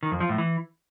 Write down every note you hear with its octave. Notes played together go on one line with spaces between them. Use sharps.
D#3
F2
F3
A2
E3